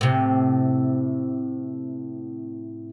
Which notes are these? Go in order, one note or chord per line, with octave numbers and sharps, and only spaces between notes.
A2 C3